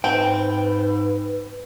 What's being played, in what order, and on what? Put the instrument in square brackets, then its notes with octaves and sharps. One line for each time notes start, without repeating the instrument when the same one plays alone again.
[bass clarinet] G#2 [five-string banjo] C4 [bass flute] B4 [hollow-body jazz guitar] G5